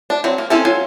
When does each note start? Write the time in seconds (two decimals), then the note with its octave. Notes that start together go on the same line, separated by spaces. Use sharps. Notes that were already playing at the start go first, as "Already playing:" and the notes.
0.10 D4
0.24 F#3 C4
0.38 A#3
0.50 C4 C#4 E4 A4
0.65 F#3 F4 G#5